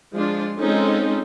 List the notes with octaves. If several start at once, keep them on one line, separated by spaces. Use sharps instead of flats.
F3 G#3 D4 F4
G#3 C4 C#4 D#4 F4 A4